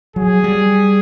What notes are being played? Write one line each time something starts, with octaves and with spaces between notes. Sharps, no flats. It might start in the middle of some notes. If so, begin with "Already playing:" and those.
F#3 G#4
G3